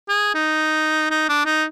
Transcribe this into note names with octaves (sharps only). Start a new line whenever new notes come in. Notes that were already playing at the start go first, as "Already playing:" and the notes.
G#4
D#4
D#4
D4
D#4